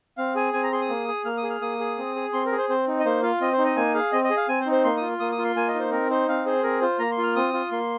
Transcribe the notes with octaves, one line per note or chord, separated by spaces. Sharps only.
C4 F5
G#4 G#5
C4 G#5
A#5
G#4 C6
D#6
A#3
G#4
A#3 F6
D#6
G#4
F6
A#3 D#6
G#4
C4
G#4
C4 C6
A#4
G#4
C5
C4 C5
D#4
D#5
A#3 C5
F4 F5
C4 D#5
C5
D#4
D#5
A#3 G#5
G#4 F5
C4 D#5
D#5
G#4
F5
C4 G#5
C5
D#4
C5
A#3 C6
F4 D#6
A#3 D#6
D#6
F4
C6
A#3 G#5
D#5
D#4 C5
C4 A#4
D#4 C5
C4 F5
G#4 C5
C4 A#4
F4 C5
A#3 A#5
C6
F4
F6
C4 D#6
F4
A#3 C6